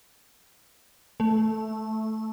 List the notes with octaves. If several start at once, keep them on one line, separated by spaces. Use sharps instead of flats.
A3